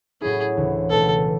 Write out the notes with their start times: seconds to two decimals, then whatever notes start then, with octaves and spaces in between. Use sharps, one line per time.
0.22 A2 F#3 C#4 E4 G#4
0.57 D2 C#3 E3
0.90 C#2 B2 A3 E4 A4